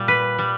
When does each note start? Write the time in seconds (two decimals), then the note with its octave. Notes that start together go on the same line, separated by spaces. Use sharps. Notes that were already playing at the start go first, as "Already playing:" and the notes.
Already playing: A#2 G3
0.08 B4
0.39 G3